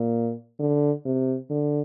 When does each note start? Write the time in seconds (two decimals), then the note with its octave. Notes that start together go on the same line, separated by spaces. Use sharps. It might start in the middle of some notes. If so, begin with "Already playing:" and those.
Already playing: A#2
0.60 D3
1.05 C3
1.50 D3